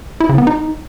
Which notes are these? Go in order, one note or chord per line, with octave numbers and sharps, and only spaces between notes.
E4
C#3
B3
D#4